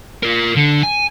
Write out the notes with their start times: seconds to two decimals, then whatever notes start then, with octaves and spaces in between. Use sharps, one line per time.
0.23 F4 A#4
0.56 D3
0.83 G#5